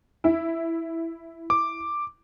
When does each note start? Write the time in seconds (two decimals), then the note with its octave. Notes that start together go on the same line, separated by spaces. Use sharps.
0.24 E4
1.50 D6